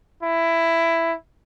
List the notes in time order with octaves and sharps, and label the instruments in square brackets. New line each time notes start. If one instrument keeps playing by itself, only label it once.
[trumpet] E4